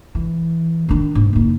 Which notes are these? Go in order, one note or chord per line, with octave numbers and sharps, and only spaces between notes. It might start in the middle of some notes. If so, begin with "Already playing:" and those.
E3
D#3 D4
G#2
F#1 D#4